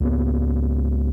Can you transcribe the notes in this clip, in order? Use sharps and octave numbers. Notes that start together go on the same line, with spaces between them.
C#2 A#3 B3